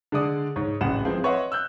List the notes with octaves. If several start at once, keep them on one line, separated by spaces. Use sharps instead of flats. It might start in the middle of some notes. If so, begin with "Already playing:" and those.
D3 G#3 G#4 D5 D#6
G#2 C#5
D1 A1 F#5 E7
E3 F3 G#3 C4
B4 C#5 D#5 E5 F#5 C6
E6 F#6 G6